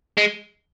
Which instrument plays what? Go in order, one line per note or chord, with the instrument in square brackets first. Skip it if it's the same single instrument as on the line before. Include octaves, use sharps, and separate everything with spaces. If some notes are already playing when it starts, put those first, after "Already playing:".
[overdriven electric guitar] G#3